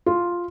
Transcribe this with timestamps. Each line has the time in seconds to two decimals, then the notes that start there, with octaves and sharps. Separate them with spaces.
0.06 F4